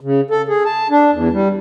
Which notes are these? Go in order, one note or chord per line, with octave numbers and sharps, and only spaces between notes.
C#3
A4
G#4
A5
D4
E2
G3